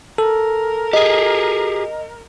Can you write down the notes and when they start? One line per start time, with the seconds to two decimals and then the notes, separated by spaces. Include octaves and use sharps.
0.18 A4 A#4
0.93 G4 G#4 D#5